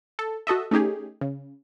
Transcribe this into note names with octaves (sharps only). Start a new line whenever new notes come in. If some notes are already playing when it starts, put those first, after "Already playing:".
A4
F#4 A4 D#5 E5
A3 C#4 D#4 G4 G#4
C#3